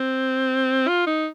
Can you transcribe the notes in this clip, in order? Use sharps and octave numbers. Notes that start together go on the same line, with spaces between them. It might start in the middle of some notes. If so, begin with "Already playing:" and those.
Already playing: C4
F4
D#4